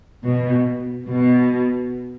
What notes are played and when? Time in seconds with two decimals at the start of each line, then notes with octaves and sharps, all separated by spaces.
0.24 B2
1.08 B2